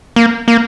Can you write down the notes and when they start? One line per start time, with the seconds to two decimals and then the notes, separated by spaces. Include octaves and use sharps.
0.16 A#3
0.48 A#3